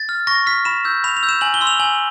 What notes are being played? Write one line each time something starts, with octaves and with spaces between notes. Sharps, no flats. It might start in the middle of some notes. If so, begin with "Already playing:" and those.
Already playing: A6
F6
C#6 A#6
F6 B6
B5 E7
E6 G6
B5 F7
F7
E6 G6
E7
G#5 F#7
G7
C6 E6
F7
G#5 F#7